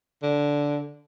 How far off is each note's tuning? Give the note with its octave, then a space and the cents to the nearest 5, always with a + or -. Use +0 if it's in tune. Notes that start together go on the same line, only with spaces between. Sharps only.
D3 -10